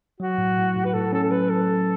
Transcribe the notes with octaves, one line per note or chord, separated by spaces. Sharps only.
F#3 F#4
A2
A2
A2
B4
A2 A4
C#4 A4
A4
F#3 B4
F#3 A4
F#3